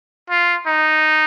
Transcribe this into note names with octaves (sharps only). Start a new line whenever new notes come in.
F4
D#4